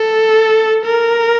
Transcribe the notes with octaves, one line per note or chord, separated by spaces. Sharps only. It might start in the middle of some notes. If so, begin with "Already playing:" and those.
Already playing: A4
A#4